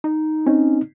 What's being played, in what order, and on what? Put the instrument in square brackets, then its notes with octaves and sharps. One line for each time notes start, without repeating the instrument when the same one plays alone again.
[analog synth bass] D#4
[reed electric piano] C4 D#4 [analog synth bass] C#4